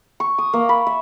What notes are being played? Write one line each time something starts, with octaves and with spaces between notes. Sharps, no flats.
C#6
D#6
A#3
B5
E5